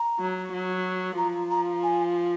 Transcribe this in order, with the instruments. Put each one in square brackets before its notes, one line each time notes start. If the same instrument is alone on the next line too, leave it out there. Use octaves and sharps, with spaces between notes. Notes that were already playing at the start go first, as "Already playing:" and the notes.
Already playing: [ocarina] A#5
[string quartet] F#3
F#3
[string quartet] F3 [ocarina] A#5
[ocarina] A#5
G#5